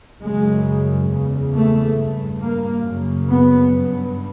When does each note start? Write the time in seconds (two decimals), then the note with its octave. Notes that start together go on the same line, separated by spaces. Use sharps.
0.21 F#2 C#3 G#3
1.10 E2 C#3
1.54 A3
1.98 G2
2.42 A#3
2.86 F#2 C#3
3.30 B3
3.74 G2